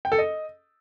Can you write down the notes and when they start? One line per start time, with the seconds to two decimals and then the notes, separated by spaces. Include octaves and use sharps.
0.05 G5
0.12 A4
0.18 D#5